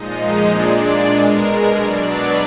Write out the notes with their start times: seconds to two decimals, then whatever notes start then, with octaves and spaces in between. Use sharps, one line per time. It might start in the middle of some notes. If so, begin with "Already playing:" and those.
Already playing: A#2 F3 G#3 D#4 D#5
0.18 D#4 D#5
0.49 A#2 G#3 D4 D5
1.12 B2 G#3 A#4
1.43 A#4
1.74 B2 F#3 D4 D5
2.05 B3 B4